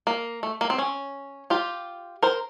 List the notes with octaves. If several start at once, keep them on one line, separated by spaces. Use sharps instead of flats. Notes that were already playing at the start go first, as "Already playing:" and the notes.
A#3
A3
A#3
C4
C#4
F4 G4
A#4 C5